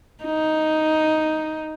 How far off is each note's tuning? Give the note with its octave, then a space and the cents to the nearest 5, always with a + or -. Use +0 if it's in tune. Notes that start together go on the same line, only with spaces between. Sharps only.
D#4 +5